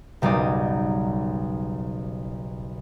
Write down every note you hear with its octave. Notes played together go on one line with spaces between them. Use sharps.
F#1 B1 G3 D#4 D5 D#6